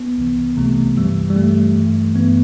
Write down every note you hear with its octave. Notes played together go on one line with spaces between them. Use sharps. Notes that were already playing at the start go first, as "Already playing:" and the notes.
Already playing: B3
C2 C3 E3
C2 C3 E3 A3
G2 E3 G3
G3
G2 E3 A3
G2 E3
G2 E3 B3